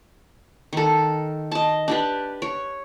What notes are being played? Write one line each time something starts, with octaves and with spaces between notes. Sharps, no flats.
D#3 A4
D#5 A5
D4 G4 B4
C#5